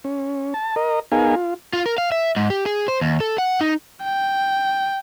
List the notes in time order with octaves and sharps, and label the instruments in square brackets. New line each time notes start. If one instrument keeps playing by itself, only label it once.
[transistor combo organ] C#4
A5
A#4 D#5
B3 D#4 G#4 A#4 F5 G#5
F4
[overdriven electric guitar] F4
A#4
F5
E5
G#2
G4
G#4
C5
D#2
A4
F#5
D#4
[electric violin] G5